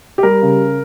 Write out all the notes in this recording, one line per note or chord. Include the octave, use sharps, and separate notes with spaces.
G4
G3 A#4
C#3